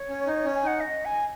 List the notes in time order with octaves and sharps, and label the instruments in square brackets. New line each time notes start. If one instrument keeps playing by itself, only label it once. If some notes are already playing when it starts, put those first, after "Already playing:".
Already playing: [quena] C#5
[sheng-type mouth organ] C#4
D#4
C#4
[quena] G#5
[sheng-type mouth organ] D#4 [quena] F#5
[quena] D#5
G#5